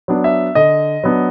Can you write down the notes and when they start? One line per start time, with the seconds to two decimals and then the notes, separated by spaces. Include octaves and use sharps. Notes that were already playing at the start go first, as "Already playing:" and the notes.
0.08 F#3 B3 D4
0.24 E5
0.55 D3 D#5
1.04 F#3 B3 D4